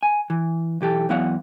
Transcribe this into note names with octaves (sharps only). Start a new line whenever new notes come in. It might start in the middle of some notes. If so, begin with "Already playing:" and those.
G#5
E3
B1 E3 G4 A4
E2 F#3 B3 E4 F5 F#5